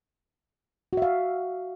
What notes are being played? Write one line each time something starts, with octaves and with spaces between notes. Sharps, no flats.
F#4 E5 F5